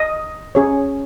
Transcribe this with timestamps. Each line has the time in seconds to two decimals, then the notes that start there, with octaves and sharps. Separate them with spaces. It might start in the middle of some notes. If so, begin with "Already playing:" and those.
Already playing: D#5
0.55 C#4 G#4 C#5